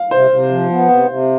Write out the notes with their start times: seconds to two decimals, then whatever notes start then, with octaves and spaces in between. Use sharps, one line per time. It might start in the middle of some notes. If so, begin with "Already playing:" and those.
Already playing: F5
0.11 C3 C5
0.30 C3
0.51 F3
0.70 B3
0.89 C3
1.09 C3